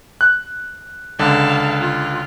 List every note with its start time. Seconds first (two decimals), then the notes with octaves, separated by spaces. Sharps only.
0.21 F#6
1.19 C#2 D3 F5 A5
1.80 F4